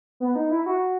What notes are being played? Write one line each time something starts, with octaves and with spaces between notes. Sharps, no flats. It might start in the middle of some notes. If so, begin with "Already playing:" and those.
B3
D#4
E4
F#4